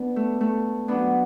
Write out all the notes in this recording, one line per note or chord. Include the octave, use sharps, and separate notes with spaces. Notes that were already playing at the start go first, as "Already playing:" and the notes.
Already playing: B3 D4
A3
A3
A2 F#3 B3 D4